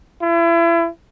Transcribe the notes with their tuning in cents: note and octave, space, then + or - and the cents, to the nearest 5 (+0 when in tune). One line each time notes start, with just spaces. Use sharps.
E4 +35